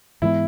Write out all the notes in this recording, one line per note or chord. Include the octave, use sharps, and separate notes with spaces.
G#2 E3 G#3 B3 E4